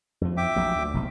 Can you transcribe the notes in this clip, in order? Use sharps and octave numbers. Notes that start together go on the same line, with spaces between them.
F2 F3
E5 G5 D6
A#1 A#2 F#3
D2
F1 B1 G#2